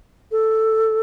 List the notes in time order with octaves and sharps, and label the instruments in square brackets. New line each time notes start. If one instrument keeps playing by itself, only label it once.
[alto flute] A4